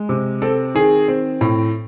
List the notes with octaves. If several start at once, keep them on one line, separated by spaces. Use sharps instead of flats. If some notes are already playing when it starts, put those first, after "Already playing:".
Already playing: G#3
C3
C4 A4
D#3 G#4
C4
A2